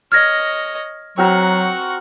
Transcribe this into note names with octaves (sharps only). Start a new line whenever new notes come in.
C#5 D#5 F6 G#6 A#6
F#3 C4 F#4 A#4 F#5 C#6